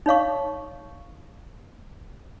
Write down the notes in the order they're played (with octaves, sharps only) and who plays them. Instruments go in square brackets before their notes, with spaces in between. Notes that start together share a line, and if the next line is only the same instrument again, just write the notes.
[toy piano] D#4 C#5 F5 C#6